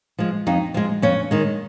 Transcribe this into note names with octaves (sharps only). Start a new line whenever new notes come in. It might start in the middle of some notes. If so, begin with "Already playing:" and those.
F3 G#3
F2 D#4
F3 G#3
F2 C#4
D#3 G#3